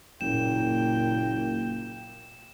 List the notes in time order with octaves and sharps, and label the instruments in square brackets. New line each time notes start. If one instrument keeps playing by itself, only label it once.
[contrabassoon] F#1 [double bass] A#2 A#3 [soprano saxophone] G5 [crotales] E7